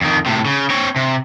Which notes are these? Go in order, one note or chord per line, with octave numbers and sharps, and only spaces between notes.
F2 D#3
A2 C3
C#3
C4 C#5
C3